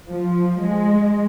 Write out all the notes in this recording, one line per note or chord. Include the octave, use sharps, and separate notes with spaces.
F3
G#3